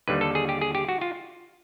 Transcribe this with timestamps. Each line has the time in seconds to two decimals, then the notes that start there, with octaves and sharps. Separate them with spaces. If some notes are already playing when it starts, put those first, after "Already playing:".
0.08 D#2 D3 G3 B4
0.21 A4
0.35 G#4
0.49 G4
0.61 G#4
0.75 G4
0.89 F#4
1.01 F4